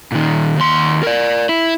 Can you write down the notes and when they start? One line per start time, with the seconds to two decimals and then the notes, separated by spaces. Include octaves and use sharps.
0.12 A#2 D#3
0.56 D#2 C6
1.03 A#4 D5
1.49 E4